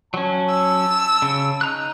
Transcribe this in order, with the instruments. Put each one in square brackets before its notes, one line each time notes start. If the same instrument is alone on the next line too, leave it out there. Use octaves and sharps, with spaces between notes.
[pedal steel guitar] F#3 C#4 [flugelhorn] A5
[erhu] E6
[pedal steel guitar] C#3
D#4 A#5 F#6